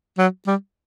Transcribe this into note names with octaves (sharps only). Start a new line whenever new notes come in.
F#3
G3